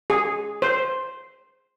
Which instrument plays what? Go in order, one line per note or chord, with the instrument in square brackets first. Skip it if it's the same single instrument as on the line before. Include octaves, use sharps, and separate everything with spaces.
[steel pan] G#4
C5